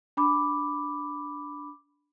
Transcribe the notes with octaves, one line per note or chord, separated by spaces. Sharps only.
D4 B5 D6